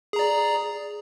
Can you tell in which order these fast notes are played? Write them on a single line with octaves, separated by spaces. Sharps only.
G#4 A#5 D5